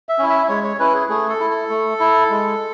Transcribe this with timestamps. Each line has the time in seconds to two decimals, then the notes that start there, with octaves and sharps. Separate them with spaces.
0.09 E5
0.19 C#4 E4
0.29 E5
0.48 G#3 C#5
0.64 C#5
0.79 C#4 E4 B4
0.95 G#4
1.09 A3 G#4
1.29 A4
1.40 E4
1.50 A4
1.70 A3
2.00 E4
2.30 G#3